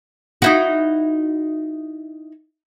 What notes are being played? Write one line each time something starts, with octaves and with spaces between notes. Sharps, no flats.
D#4 E4 F#4